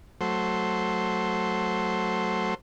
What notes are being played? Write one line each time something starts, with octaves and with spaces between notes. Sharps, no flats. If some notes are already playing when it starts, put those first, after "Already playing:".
F#3 A3 C5